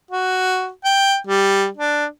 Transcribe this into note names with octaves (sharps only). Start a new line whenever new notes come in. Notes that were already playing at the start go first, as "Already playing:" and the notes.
F#4
G5
G3
D4